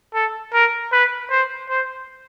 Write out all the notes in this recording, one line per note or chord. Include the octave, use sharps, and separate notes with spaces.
A4
A#4
B4
C5
C5